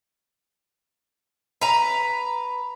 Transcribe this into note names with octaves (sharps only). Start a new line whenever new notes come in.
B4 A#5